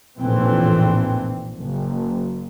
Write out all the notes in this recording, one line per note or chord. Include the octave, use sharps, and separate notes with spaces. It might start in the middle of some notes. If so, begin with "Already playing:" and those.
F1 A#1 A2 E3 C4
F#1